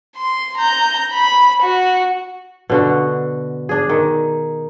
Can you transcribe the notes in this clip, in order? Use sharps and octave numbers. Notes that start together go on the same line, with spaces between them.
C6
A#5 G6
B5
F#4
B2 D3 F#4
D4 G#4
D#3